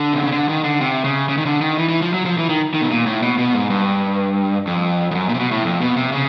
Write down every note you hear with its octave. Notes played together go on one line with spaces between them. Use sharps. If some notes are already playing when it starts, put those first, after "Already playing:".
Already playing: D3
C3
C#3
D3
D#3
D3
C3
C#3
C#3
D#3
D3
D#3
E3
E3
F3
F#3
F3
E3
D#3
D#3
B2
A#2
A2
B2
B2
G#2
G2
F2
F2
F#2
A#2
C3
B2
A2
F2
B2
C3
C#3